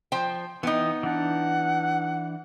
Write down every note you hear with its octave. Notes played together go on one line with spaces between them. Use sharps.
F3 C5 G5
E3 B3 D#4 G5 D#6
E3 D4 F#5